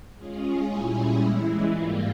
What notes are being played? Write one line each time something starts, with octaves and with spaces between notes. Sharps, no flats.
G#3 C#4 F4 G#4
A#2 G3 C#4 E4 G#4
E3 G#3 E4
G#2 G3 A#3 F4